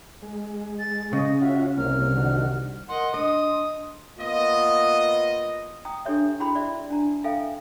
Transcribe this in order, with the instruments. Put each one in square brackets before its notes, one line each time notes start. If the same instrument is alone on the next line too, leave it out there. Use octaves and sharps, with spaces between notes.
[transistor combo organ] G#3
[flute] A6
[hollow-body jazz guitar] C#3 [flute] D#5
[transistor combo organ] C#4 F4 F#4 [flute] E5
[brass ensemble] C2 [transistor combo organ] A#3 C#4 [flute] F6
[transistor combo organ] D3 D#3 F#4
[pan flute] A#4 [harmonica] D#5 F#5 [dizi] C6
[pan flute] D4 [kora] D#5 [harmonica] D#6
[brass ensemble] A#3 B3 F4 D#5
[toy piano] G5 A#5 D#6
D4 G4 A4 C#5 E5
E4 F#4 G#4 G5 B5 C6
D5 E5
D4 A#5
A4 E5 F5 G5 G#5